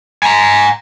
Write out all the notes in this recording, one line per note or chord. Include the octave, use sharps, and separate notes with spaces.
G#5 A#5